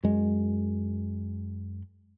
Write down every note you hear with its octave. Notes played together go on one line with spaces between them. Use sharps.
F#2 G#3